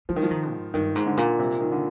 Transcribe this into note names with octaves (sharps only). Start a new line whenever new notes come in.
F3 G3
D#3
F3
D#3
G#2
G2 D#3
G#2
D3
A#2
C3
D#3
D3